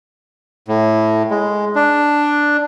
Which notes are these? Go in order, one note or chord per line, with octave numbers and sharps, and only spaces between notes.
A2
G#3
D4